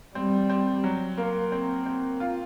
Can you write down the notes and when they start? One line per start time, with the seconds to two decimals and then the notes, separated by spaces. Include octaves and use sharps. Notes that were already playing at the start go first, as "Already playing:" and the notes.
0.15 G3 C4
0.50 C4
0.84 F#3
1.18 A#3
1.52 C4
1.86 C4
2.20 F4